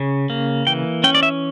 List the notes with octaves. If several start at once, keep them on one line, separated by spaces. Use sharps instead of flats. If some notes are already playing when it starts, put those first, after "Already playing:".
Already playing: C#3 C#4
A#3
E3 G5
C#4 G5
D5
E5